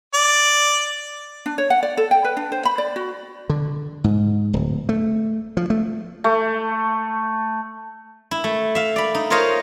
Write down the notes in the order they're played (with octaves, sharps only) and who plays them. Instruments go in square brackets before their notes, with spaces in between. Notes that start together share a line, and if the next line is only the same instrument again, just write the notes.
[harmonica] D5
[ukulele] D4
C#5
F#5
D5
A4
G5
B4
D4
C5
B5
D5
F#4
[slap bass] D3
G#2
D1
A3
F3
A3
[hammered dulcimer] A3
[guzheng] E4
A3
E5 F5
D5 B5
D#4
F4 A#4 C5 C#5 D#5 F5